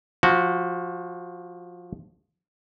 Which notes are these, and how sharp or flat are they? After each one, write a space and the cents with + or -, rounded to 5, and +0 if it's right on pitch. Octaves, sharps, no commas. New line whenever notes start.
F3 +15 F#4 +0